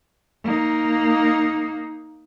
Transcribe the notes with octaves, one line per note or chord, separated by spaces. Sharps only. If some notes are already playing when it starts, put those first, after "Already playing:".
A#3 D#4